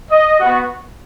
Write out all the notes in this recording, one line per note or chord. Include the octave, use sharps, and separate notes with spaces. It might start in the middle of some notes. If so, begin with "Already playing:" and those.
D#5
B3 F#4